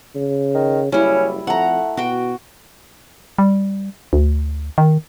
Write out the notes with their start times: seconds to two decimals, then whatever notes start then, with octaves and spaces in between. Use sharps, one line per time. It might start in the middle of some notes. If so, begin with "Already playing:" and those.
0.15 C#3
0.54 D#3
0.92 F#1 G3 C#4 E4
1.47 F2 A3 F#5 A#5
1.97 B2 F#4 G5
3.38 G3
4.13 D2
4.78 D#3